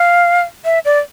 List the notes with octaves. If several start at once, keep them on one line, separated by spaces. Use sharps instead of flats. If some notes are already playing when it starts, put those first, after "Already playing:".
Already playing: F5
E5
D5